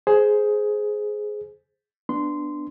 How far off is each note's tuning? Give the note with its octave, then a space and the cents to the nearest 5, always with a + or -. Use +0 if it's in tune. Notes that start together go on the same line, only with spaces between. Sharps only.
G#4 +10 C5 +0
B3 +0 D4 +5 C6 -15